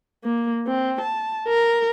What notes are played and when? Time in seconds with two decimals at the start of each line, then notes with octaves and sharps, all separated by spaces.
0.24 A#3
0.67 C4
1.01 A5
1.48 A#4